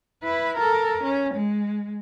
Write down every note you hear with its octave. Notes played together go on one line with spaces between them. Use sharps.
E4 B4
A4 A#4
C#4
G#3